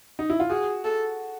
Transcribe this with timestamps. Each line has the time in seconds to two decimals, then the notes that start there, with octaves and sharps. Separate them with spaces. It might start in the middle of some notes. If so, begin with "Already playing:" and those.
0.19 D#4
0.30 E4
0.40 F4
0.50 F#4 G#4
0.84 A4